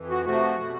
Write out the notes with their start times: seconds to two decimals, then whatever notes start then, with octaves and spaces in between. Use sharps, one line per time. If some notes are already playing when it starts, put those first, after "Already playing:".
Already playing: F2 E3
0.10 F#4
0.25 C3 F3 A3 F#4
0.59 B2 G3